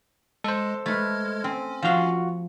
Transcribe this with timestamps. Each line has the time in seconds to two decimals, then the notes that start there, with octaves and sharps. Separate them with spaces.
0.44 G#3 A4 C5
0.86 G#3 A3 B4 F6 G#6
1.44 C4 C#4
1.83 F3 F4 F#4 F5